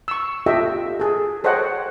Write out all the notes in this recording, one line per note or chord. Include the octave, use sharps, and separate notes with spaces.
C#6 E6
F4 G4 A4 D#5 E5 G5
G#4 A4
A4 C5 C#5 D#5 F#5 G5